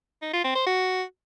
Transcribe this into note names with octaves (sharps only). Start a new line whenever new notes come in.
D#4
F4
C4
C5
F#4